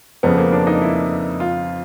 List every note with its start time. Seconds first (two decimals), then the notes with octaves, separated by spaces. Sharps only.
0.23 F2 C#3 F3 B3
0.38 A#3
0.53 D4
0.67 D#4
0.82 E4
1.40 F4